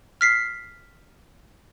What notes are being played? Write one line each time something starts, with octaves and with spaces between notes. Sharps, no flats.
F6 B6 C7